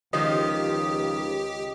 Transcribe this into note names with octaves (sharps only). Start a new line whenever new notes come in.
C#2 D#3 F3 G4 D#5